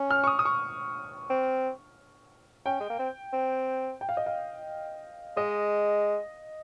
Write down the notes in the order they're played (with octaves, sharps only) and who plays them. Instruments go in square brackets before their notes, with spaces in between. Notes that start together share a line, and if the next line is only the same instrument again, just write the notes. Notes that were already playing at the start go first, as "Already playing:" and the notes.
Already playing: [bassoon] C#4
[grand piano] F6
C#6
D#6
D#6
C#6
[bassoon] C4
[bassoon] C#4 [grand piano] G5
[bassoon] G#3
A#3
C4
C4
[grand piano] G5
F5
D#5
F5
[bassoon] G#3 [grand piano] D#5